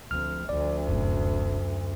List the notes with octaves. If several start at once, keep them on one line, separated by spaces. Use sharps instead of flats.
D2 F3 C4 F6
D2 F3 D5
F1 F#2 A2